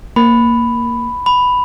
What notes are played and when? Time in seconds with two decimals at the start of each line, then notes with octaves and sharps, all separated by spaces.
0.16 A#3 B5
1.26 B5